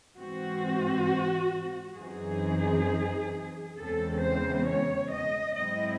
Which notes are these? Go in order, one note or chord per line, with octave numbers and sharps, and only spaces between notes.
G#2 E3 C4 F#4
F#2 E3 C4 D#4 G#4
E2 C#3 G#3 C4 A4
C5
C#5
D#5
G#2 F#3 C4 E4 D#5